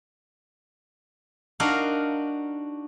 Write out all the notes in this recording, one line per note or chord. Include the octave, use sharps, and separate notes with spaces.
D4 D#4 F#4 A#4 F5